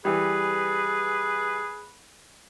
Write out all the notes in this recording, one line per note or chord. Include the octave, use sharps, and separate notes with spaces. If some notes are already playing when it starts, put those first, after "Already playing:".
E3 G3 G#4 B4